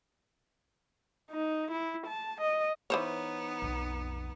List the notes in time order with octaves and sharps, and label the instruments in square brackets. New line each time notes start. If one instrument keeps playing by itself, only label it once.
[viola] D#4
E4
A5
D#5
[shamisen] E3 C5 C#5 [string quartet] B3 D#4
[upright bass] B1 F2